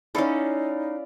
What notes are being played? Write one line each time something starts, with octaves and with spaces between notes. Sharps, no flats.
C#4 D#4 E4 A4 D5 F5